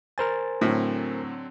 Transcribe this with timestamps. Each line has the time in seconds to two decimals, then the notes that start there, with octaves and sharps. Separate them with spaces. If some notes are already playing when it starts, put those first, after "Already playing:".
0.18 A#4 C5 G#5 A6
0.61 A2 D3 F#3 C4